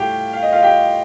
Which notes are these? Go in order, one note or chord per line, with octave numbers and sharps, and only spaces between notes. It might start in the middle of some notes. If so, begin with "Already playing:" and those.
Already playing: A2 G3 F4 G4 F5 G5
F5
D#5
F4 F5
G4 G5